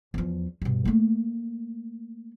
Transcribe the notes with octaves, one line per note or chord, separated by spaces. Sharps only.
E2 F3
G2 B2
A3 A#3